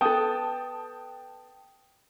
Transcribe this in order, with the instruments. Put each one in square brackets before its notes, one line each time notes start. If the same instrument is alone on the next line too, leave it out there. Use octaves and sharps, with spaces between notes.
[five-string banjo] B3 A4 [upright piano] G5 A5 D#6